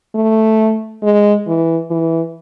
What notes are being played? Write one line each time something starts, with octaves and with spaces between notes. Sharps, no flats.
A3
G#3
E3
E3